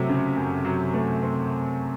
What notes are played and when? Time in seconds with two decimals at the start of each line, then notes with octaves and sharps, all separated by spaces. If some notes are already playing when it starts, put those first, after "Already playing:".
Already playing: C3 F#3 A3
0.09 C#3
0.37 F#2
0.65 F#3
0.94 A3
1.22 C4